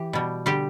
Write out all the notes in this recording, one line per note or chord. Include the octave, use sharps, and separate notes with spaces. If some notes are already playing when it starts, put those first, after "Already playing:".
Already playing: E3 G4
B2 G3
D3 G3 G4